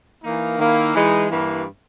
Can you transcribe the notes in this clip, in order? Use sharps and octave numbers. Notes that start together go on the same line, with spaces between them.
E3 A#3 D#4
D#3 A#3 E4
E3 G#3 D#4
G2 E3 A#3